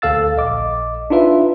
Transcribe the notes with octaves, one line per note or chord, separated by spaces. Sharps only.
D2 A4 F5 E6 A6
A#1 D#5 D6
D4 D#4 F4 B4 E5